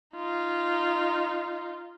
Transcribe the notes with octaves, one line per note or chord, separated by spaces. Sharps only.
D#4 F4